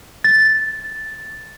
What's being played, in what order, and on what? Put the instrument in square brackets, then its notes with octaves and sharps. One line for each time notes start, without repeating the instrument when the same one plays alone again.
[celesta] A6